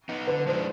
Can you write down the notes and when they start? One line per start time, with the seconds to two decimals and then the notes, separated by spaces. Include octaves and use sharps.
0.09 B3 D#4
0.27 D3 B4
0.47 F3 G#3 D4 C5